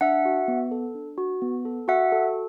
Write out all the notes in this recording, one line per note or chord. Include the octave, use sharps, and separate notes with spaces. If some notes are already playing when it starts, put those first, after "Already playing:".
D4 E5 F#5
F#4
B3
A4
D4
F#4
B3
A4
F#4 E5 F#5
A4